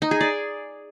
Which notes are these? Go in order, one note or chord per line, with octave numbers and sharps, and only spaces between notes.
D#4
G#4
D5